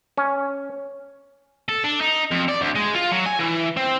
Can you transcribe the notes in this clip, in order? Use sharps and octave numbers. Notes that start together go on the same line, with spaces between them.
C#4
A4
D4
D#4
F2
D5
D2
G#3
F4
F#3
G#5
E3
C4